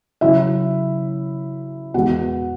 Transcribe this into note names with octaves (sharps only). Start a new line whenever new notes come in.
C#3 F#3 C#4 E4 E5
E2 B2 G#3 B3 F#4 F#5